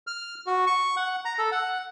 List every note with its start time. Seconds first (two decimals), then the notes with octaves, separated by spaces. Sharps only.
0.07 F6
0.47 F#4
0.67 C#6
0.97 F#5
1.25 A#5
1.39 A4
1.52 F#5